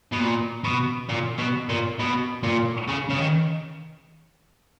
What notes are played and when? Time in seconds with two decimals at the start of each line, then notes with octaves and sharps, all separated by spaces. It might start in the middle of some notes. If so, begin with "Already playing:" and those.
0.12 B2
0.20 A#2
0.64 B2
1.09 A#2
1.38 B2
1.69 A#2
1.99 B2
2.43 A#2
2.88 C#3
3.10 C#3
3.18 D#3